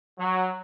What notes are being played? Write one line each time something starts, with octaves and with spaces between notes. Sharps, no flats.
F#3